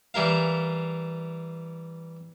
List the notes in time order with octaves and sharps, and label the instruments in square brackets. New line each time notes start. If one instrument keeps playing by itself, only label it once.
[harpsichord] E3 G3 E4 A#4 F5